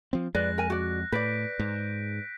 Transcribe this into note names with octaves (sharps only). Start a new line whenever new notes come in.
F3 C4
F2 G#3 B4 D5 F#6 A#6
A#4 G#5
F#4 D5
A2 B4 D5 G6 B6 D7
G#2